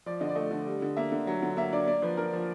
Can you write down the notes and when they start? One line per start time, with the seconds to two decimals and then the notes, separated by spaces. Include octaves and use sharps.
0.06 F3 D5
0.21 D3 D#5
0.29 D5
0.35 A3 D#5
0.51 D3
0.66 G3
0.82 D3
0.97 A#3 E5
1.12 D3
1.27 F#3
1.43 D3
1.57 A#3 E5
1.72 D4 D5
1.87 A#3 D5
2.02 F3 B4
2.17 D4 A#4
2.33 F3